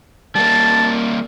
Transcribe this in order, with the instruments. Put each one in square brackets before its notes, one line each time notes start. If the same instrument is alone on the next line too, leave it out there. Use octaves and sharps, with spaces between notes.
[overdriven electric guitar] G3 A#3 [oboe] A5